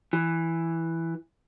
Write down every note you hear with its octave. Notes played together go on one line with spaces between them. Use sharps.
E3